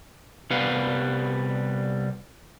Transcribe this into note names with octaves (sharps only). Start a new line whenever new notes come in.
C2 G3 B3 B4 F5